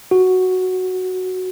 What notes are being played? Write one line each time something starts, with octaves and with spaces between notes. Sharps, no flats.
F#4